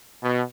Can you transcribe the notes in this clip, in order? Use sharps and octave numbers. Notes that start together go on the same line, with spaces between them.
B2